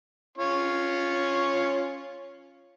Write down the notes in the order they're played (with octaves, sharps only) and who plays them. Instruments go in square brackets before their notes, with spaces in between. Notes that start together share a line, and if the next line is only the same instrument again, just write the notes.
[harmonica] C#4 F4 C#5